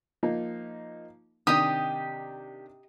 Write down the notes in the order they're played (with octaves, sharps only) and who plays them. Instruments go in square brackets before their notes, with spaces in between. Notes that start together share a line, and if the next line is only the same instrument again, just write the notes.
[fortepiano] F3 A#3 D#4
[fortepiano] C3 D#3 D4 [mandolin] G4 [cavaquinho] D#5 D#6